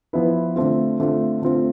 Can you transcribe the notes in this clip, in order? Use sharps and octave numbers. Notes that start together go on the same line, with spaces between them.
F3 B3 E4 B4
D3 A3 C4 F4
D3 A3 C4 F4
D3 A3 C4 F4